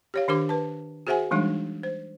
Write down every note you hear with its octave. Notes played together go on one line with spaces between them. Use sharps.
G4 C#5 F5
D#3 D4 G4 A#4 D6
B4 A5
F#4 G#4 C5 E5 F#5 G#5
E3 G3 G#3 D4 D#4
C5